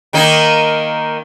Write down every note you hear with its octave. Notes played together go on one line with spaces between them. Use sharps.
D#3 A#3 D#4